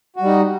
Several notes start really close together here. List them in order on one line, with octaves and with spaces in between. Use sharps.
F#4 G3 D#4